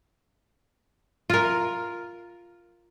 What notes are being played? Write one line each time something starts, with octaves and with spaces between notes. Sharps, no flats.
F4 A#4